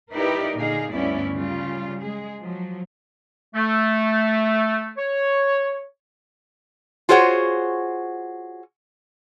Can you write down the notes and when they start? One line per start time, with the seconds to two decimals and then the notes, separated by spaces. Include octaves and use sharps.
0.13 D#4 E4 G4 A#4 B4 D5
0.57 A#2 D3 A#3 D#4 G#4 F5
0.90 D2 G2 B3 C#4 E4 D5
1.33 C#3 G3 F4
2.01 G#3 G#4
2.41 F3 F#3
3.55 A3
4.97 C#5
7.09 F4 F#4 G#4 C5 C#5 F#5